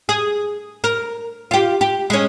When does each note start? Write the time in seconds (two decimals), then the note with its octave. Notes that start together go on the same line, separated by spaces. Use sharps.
0.09 G#4
0.84 A#4
1.51 F4 G4
1.81 G4
2.10 G#3 C#4